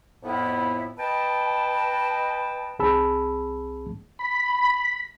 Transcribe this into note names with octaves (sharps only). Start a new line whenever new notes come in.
F2 A2 B3 E4
B4 D#5 G5 A5
C2 C4 G#4 A5 B5 E6
B5